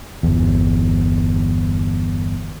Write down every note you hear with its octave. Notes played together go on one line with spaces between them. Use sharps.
G1 E2